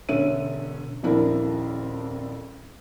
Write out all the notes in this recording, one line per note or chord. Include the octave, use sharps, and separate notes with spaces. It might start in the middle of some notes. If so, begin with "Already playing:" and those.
E1 D3 C#4 C#5 E5 D#7
D#1 F2 D4 E4 A#4